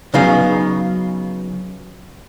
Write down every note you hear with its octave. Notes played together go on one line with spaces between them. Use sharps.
C#3 F#3 B3 D#4 F5